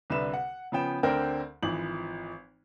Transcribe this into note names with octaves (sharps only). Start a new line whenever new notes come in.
C2 D3 B4 E5 E7
F#5
C#3 F3 B3 C#4 G5 E7
D2 D3 C4 A#4 G5
G#1 E3 F3 F#7